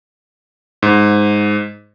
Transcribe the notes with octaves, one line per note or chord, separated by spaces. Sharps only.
G#2